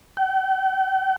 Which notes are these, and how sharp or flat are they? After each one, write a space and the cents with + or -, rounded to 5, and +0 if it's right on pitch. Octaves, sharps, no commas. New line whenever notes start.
G5 -45